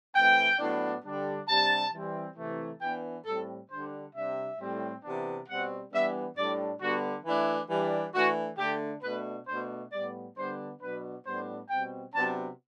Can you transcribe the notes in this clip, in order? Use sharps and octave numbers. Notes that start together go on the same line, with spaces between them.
E3 A3 C4 G5
A2 F#3 B3 D4
D3 G3 D4
C3 G3 D4 A5
E3 G3 C4
C3 E3 A3
E3 B3 D4 G5
A2 G3 C4 A4
D3 G3 D4 C5
C3 G3 D4 E5
A2 G3 C4
C3 E3 B3 D4
B2 G3 C4 F#5
E3 G3 B3 D4 E5
A2 G3 D4 D5
D3 G3 B3 D4 F#4
E3 A3 D4 E4
E3 G3 D4
E3 A3 D4 F#4
D3 A3 D4 G4
B2 A3 D4 B4
B2 A3 D4 C5
A2 G3 B3 D5
D3 G3 B3 D4 C5
B2 F#3 B3 D4 B4
A2 G3 B3 D4 C5
B2 G3 C4 G5
C3 F#3 B3 D4 A5